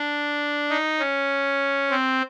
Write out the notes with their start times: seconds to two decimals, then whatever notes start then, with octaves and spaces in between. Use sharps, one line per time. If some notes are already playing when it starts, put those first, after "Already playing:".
Already playing: D4
0.70 D#4
1.00 C#4
1.90 C4